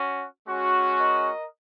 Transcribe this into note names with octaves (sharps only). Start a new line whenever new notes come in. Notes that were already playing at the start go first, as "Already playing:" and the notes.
Already playing: C#4 F#4
G#3 C#4 F#4
A#4 D#5